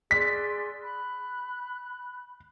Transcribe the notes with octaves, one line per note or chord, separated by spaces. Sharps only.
G#4 D5 C6 B6
B5 F#6